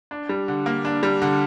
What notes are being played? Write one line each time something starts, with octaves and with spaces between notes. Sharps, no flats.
D4
G3
D3
A#3
D4
G3
D3